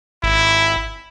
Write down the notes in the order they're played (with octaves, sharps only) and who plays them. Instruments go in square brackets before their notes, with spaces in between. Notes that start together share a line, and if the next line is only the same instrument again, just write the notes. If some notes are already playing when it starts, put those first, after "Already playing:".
[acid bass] G#1 [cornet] E4